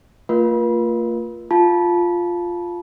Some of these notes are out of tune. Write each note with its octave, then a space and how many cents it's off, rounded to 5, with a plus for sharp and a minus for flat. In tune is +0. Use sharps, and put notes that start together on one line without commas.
A#3 -40 F4 +0 A#4 +45
F4 +0 A5 -15